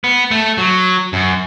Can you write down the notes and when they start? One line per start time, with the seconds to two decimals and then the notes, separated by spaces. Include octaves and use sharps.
0.04 B3
0.31 A3
0.58 F#3
1.13 F#2